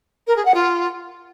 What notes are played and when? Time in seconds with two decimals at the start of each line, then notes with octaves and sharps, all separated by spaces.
0.27 A#4
0.36 G#4
0.45 F#5
0.54 F4